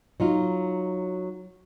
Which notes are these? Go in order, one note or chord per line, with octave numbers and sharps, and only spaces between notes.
F#3 D#4 F4